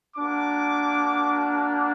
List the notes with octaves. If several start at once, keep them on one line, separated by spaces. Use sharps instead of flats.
A#3 D4 F#4 D6